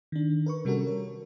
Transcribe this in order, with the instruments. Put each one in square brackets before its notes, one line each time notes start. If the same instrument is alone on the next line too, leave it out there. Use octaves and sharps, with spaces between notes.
[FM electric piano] D#3 D4
A#4 B4 C#6
C3 G3 C#4 F#4 A4 A#4
C#5